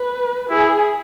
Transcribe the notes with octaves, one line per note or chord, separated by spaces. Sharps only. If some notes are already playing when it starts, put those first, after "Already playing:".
Already playing: B4
E4 G#4